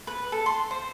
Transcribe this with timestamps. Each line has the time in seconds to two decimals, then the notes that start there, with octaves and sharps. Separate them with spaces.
0.07 B4
0.32 A4
0.46 C6
0.71 C5